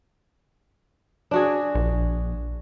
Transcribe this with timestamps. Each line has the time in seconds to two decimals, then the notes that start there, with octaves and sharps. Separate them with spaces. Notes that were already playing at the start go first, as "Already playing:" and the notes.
1.31 D4 F#4 G#4
1.75 A#1